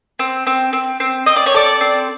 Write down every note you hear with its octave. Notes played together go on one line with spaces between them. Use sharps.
C4
C4
C4
C4
C4 D#5
D5
C#5
A4 D5
C4